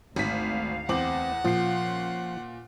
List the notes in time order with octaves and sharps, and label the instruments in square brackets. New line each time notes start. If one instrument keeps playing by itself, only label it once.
[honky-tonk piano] G#1 B6 [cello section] D2 F5
[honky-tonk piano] E2 D6 F#7 [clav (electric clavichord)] C4 [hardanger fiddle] F#5
[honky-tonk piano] A#2 C7 [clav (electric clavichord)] F3 [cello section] C#4 C5 F5